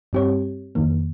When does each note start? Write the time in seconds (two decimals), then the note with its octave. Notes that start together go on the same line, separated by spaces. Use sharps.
0.13 G2 G3 C4 G4 C#5
0.75 F2 D#3 A#3